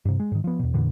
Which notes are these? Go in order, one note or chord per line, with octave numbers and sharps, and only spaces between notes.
G2 C3
G#3
G#2 D#3
F3 B3
E2 B2
F2 A#2 D3 E3